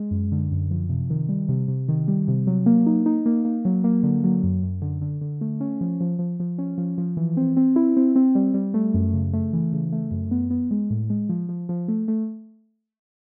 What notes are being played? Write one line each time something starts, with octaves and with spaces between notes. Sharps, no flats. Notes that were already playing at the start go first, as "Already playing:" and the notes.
Already playing: G#3
F#2
D3
F#2
F3
C3
D#3
G3
C3
C3
D#3
G3
C3
F#3
A#3
D#4
D#4
A#3
A#3
F#3
A#3
D3
F#3
F#2
F#2
D3
D3
D3
A3
C#4
F3
F3
F3
F3
C#4
F3
F3
E3
C4
C4
E4
C4
C4
G3
G3
A3
F#2
C#3
A3
E3
C#3
A3
F#2
B3
B3
G#3
A2
G#3
F3
F3
F3
A3
A3